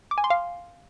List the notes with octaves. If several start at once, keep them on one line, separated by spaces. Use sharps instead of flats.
D6
G#5
C6
F5